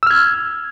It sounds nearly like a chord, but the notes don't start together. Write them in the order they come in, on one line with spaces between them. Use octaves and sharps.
E6 F6 G#6